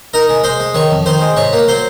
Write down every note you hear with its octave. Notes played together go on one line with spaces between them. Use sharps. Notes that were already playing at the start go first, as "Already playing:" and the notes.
D#4 A#4 A#5
G#3
G#3 C5 C6
G#3
D#3 C#5 C#6
F2
D#3 C5 C6
G#3
G#2 C#5 C#6
A#3
F#3 C5 C6